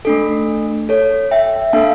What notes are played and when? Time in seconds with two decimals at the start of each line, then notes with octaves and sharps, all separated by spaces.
0.05 A3 D4 A4
0.89 A4 C#5
1.31 E5 G5
1.73 A#3 D4 A4 F5 A5